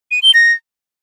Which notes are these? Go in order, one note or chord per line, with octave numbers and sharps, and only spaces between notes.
D#7
G7
A#6